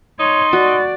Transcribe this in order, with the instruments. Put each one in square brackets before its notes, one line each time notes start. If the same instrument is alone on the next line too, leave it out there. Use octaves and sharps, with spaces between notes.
[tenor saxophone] D#4 [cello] C#5 [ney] C6
[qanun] F#4 [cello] D5